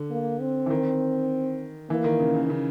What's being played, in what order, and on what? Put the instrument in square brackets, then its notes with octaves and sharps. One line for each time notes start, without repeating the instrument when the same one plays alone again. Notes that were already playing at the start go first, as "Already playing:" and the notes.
Already playing: [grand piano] D3
[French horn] A#3
C4
[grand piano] E3
D#3
[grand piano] E3 [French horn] A#3
[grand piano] D#3
C#3
C#3
C#3